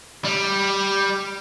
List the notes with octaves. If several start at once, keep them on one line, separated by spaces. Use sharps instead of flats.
G3